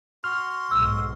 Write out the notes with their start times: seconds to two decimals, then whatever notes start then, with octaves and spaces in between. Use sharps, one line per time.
0.24 F#4 C6 F6
0.71 B1 G#2 E6